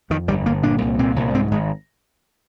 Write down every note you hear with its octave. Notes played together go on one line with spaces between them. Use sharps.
F2 D#3
G1 G3
G1 A#3
A#2 D4
C2
A#2 C4
C2
G#2 C4
G#1 G#3